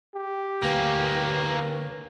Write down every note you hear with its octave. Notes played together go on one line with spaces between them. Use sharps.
G4
D2 A#3 C#4 B4